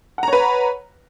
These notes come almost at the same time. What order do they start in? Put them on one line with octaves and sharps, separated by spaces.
F#5 A#5 C#5 B4